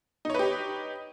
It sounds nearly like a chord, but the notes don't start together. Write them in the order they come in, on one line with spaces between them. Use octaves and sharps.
D#4 C#5 B4 G4